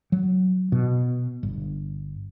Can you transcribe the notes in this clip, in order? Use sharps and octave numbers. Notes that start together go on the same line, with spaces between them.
F#3
B2
G1